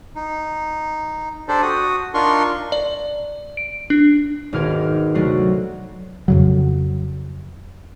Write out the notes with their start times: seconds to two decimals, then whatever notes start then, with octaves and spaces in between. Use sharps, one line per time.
0.16 D#4
1.48 D4 G4 A4 C5 D5
1.62 F#4 D#6
2.14 D4 D#4 F4 A#4 C6 C#6
2.72 D5
3.57 D7
3.90 D4
4.53 G#1 D#2 B2 D6 F6 G#6
5.14 D2 C3 F#3 A3 F#4 C7
6.28 F2 C#3 F#3